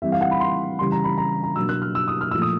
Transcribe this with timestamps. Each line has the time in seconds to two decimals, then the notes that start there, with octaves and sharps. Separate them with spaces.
0.02 E3 G3 C4 E4 E5
0.12 F5
0.21 F#5
0.31 B5
0.40 C6
0.79 C#3 E3 G3 C6
0.92 A#5
1.04 B5
1.18 A#5
1.43 A#5
1.56 B2 F#3 A#3 D4 E6
1.69 F#6
1.82 F6
1.95 E6
2.08 D#6
2.21 F6
2.31 A#2 F3 A3 E6
2.42 D#6